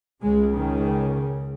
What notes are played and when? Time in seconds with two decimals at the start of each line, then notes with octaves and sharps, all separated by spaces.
0.22 C#2 C#3 G#3
0.53 D#3